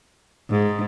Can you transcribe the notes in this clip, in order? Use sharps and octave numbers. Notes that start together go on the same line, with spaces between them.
G#2